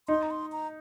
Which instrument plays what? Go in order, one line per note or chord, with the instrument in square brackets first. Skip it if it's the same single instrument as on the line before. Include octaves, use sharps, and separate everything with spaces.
[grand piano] D#4 [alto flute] C6
[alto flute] A#5
C6
A#5